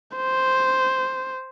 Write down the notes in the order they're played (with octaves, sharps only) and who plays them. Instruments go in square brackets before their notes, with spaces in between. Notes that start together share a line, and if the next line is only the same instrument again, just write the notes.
[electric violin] C5